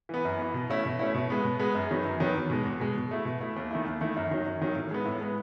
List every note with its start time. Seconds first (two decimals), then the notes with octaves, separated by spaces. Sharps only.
0.09 E3 B3
0.25 F#2
0.39 E3 B3
0.54 B2
0.70 A3 C#4 E4
0.85 B2
0.99 A3 C#4 E4
1.15 B2
1.30 G#3 B3
1.44 B2
1.59 G#3 B3
1.75 F#2
1.91 D#3 F#3 B3
2.05 F#2
2.20 D#3 F#3 B3
2.36 E2
2.50 B2 G#3
2.65 E2
2.80 B2 G#3
2.96 B2
3.11 A3 E4
3.25 B2
3.41 A3 E4
3.56 D#2
3.71 D#3 A3 E4
3.85 D#2
4.01 D#3 A3 E4
4.16 F#2
4.31 D#3 F#3
4.46 F#2
4.61 D#3 F#3
4.76 A2
4.91 G#3 B3
5.05 A2
5.21 G#3 B3